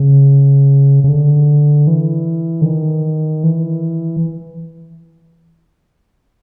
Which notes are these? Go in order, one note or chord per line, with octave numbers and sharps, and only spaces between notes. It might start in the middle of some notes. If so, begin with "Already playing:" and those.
Already playing: C#3
C#3
D3
E3
D3
D#3
E3